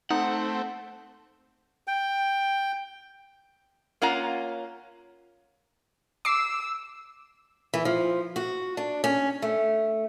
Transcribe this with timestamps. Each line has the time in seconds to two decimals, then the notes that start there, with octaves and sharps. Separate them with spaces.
0.10 A3 C4 D#4 F#5
1.87 G5
4.02 A#3 C#4 F4 F#5 A#5
6.25 D6 E6 C7
7.74 E3
7.85 F3
8.36 F#4
8.77 D4
9.04 C#4
9.42 A3